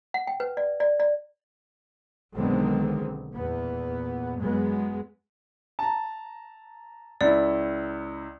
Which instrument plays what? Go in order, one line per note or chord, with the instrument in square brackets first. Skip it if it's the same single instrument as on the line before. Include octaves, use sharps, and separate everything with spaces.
[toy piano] F#5
G5
B4
D5
D5
D5
[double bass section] B1 D3 D#3 G#3 B3 C4
E2 A#2 B3
F#2 F#3 G#3 B3
[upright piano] A5 A#5
[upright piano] C#2 E4 [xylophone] D5